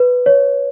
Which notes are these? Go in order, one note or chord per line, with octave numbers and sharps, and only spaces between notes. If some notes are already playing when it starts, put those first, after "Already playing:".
Already playing: B4
C#5